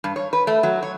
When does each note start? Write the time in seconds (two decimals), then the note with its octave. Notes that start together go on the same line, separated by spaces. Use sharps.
0.04 G2
0.16 C#5
0.33 B4
0.47 A3
0.63 F#3
0.83 C#5